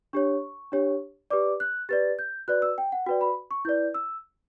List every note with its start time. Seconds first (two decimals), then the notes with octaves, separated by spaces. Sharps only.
0.13 D4 G4 C#5 C#6
0.72 D4 G4 C#5
1.30 G4 B4 D5 D6
1.60 F#6
1.89 G4 B4 D5 A6
2.19 G6
2.48 F#4 B4 D5 F#6
2.62 E6
2.78 G5
2.92 F#5
3.07 F#4 B4 D5 G5
3.21 B5
3.51 C#6
3.65 E4 B4 D5 G6
3.94 E6